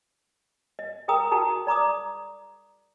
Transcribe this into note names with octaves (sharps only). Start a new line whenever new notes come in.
D#5
G#4 A#4 G5 A#5 D#6
D#4 F#4 G#4 A5 A#5 D#6
D5 A#5 D6 D#6